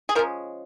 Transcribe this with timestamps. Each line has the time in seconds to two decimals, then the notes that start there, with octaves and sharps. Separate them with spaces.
0.09 G#4
0.15 F3 G#3 C#4 A#4